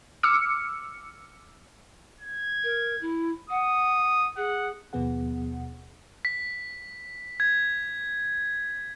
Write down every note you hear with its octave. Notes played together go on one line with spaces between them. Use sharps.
D6 E6 F6 C#7
G#6
A#4
E4
F#5 D#6
G#4 F#5
D#2 B2 F3 B3 G#4 F#5
B6
G#6